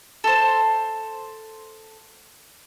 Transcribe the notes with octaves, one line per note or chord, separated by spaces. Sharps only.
A4 C5